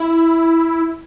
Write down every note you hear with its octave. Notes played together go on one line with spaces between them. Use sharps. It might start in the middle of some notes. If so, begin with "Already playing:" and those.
Already playing: E4